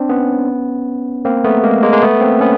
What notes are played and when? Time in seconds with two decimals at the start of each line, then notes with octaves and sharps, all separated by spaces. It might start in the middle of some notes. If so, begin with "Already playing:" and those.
Already playing: C4 D4
0.09 B3 C#4
1.25 A#3 C4
1.44 A3 B3
1.63 G#3 A#3
1.83 G#3 A#3
1.93 G#3 A#3
2.02 A3 B3
2.21 A#3 C4
2.40 B3 C#4